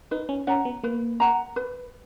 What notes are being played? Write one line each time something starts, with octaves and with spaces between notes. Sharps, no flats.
D#4 B4
C#4
C#4 F#5 A#5
B3
A#3 B4
F#5 A#5
B4